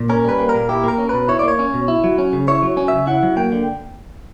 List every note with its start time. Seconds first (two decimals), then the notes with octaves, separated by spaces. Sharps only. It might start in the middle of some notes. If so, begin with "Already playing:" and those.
Already playing: A#2
0.09 C#4 A#4
0.25 G3 B4
0.39 A#3
0.49 A#4
0.54 A#2
0.69 E4 G4
0.84 A#3 A#4
0.98 C#4
1.09 B2 B4
1.28 E4 C#5
1.39 D5
1.43 A#3
1.48 C#5
1.59 C#4
1.74 B2
1.88 E4
2.04 F#3
2.18 C#4
2.33 C#3
2.48 E4 C#5
2.62 F#3
2.77 C#4
2.88 C#3 E5
3.07 E4 F#5
3.23 F#3
3.37 A#3 G5
3.52 D3